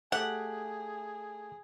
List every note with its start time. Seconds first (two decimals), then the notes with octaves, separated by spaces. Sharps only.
0.12 A3 G4 G#4 F#5